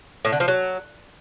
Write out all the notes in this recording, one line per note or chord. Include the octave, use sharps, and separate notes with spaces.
A2
D3
F3
F#3